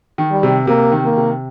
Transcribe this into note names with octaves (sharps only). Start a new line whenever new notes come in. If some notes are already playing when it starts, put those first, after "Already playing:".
D#3
G3
C3
C3 A#3
D#3
A#3
C3